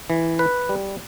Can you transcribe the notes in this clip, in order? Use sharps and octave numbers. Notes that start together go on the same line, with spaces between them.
E3
B4
G3